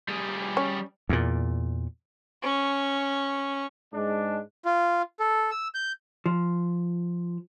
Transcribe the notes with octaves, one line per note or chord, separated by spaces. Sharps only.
G3 G#4
C#4
E2 A#2
C#4 C#6
G#2 G#3 D4
F4
A4
E6
G6
F3